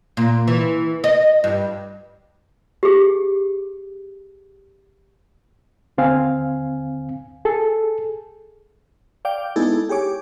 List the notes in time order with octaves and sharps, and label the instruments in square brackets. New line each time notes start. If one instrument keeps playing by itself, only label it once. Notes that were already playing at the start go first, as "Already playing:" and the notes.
[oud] A#2
E3
D#5
G2
[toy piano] G4 G#4
[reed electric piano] D#2 D3 C4 F5 G#5
G#4 A4
[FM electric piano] D5 F5 G5 D6
G#3 B3 D#4 E4 G#4 A4
G4 G#4 C#5 D6